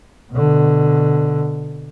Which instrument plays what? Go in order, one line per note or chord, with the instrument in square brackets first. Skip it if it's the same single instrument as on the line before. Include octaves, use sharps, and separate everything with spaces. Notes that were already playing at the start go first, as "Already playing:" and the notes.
[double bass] B2 D3